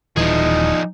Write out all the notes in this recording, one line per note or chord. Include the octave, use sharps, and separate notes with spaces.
D#1 E3 F3 D#4 G#4